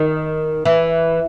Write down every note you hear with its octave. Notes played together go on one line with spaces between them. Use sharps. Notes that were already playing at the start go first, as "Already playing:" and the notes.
Already playing: D#3
E3